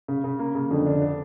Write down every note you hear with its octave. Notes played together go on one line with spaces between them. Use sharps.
C#3
C#3
A#3
C#3
F2 D3
D4
D4